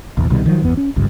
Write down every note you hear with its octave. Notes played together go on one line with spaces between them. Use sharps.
A#1 E2 B2
C2 B2 D#3 G3
D#3 F3 F#3
G1 E2 B3
C#4
G#1 C#2 G2